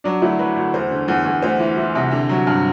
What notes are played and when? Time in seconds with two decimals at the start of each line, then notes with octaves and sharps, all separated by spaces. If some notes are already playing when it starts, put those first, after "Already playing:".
0.04 F#3 D4
0.22 D2 E4
0.39 F#3 B4
0.57 D2
0.74 E2 C5
0.91 D3
1.08 E2
1.26 E2
1.42 D2 C5
1.59 E3
1.77 E3
1.95 C3
2.11 D3
2.29 F#3
2.47 G2